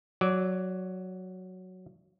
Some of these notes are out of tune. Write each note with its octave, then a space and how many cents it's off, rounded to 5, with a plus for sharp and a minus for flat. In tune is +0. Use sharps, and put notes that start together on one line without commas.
F#3 +0 D5 -15